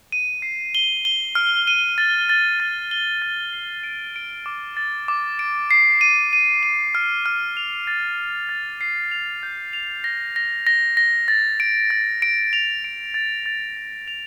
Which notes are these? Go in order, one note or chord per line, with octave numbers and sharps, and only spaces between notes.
D#7
C7
G7
G7
F6
D#7
A6
A6
A6
G7
A6
C7
D7
D7
D6
A6
D6
D7
C7
D#7
D#7
D#7
F6
F6
F7
A6
C7
A6
C7
F7
G6
F7
A#6
A#6
A#6
A#6
A6
D7
A6
D7
F7
D7
A6
A6
A6
F7